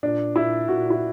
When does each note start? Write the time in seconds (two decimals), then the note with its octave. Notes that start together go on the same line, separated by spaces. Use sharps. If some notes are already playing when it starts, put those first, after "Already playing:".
0.03 A#2 D4
0.36 A#2 E4
0.68 A#2 F#4
0.90 E4